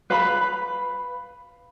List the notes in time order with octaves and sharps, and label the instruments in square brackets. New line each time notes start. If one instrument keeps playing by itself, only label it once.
[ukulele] B4 F5 B5